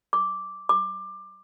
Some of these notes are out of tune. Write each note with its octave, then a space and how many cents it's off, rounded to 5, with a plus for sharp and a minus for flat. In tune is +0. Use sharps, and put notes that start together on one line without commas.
D6 -5
D6 +20